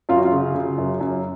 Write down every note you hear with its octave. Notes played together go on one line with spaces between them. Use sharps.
F#2 F4
F#4
F4
C#3
C#3
F#2
F#2